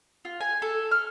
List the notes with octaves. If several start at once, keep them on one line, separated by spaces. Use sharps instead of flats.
F4
G#5
A4
F6